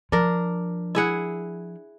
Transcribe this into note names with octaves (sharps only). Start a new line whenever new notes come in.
F3 D4 A#4
E4 G#4 F#5